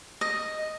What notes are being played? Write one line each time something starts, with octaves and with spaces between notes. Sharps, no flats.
D#5